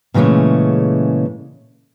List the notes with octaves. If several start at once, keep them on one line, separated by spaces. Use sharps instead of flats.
A#2 C#3 E3 G#3 A3 C#4